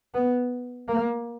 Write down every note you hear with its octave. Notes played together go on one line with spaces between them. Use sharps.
B3
A#3